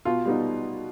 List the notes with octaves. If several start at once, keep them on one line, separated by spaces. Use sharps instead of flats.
B2 F4
G3 B3 D#4